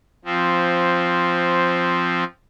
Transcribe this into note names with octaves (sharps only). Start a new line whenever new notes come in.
F3 C4